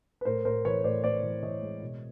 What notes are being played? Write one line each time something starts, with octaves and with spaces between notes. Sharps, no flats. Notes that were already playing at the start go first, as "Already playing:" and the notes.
B4
A2 A#4 C5
A2 A#4 C5
E3 B4 C#5
A2 C5 D5
A2 C5 D5
E3
E3 C#5 D#5
G#3
B2